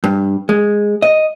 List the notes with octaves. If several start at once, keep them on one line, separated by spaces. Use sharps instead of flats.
G2
G#3
D#5